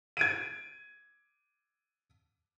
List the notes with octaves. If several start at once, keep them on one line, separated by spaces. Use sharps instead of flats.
G#6 D7 D#7